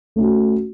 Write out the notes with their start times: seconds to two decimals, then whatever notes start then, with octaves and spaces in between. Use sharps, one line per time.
0.16 A3 C#4 F#4